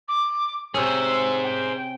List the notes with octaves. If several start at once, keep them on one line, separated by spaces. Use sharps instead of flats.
D6
C3 C#4 G#4 C5 E6
G5